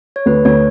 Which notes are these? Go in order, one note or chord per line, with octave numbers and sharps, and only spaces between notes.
C#5
D2 B4
D2 C#5